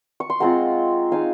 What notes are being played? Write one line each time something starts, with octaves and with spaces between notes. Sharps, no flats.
C#6
C6
G#3 C4 F4 F#5 A#5
G#3 D#4 F5 G#5